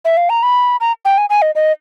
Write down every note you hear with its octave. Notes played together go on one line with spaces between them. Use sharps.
E5
F5
A#5
B5
A#5
G5
G#5
G#5
D#5
D#5